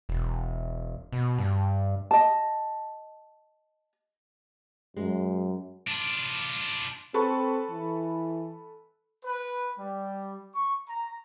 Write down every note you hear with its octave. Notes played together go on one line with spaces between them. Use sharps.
E1
B2
G2
D#5 A5
F#2 G#3
D4 F4
C4 A4 B4 C#6
E3
B4
G3
C#6
A#5